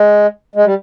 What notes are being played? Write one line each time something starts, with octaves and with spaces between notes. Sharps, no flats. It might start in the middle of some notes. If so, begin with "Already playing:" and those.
Already playing: G#3
G#3
G3